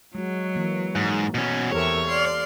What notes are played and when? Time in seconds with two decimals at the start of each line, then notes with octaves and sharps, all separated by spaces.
0.15 F#3 G#3 F#4
0.55 E3 A#3
0.96 G#2
1.35 B2 C#4
1.72 E2 G4 A4 A#4 C5 C#5 E5
2.06 D5 F5 C6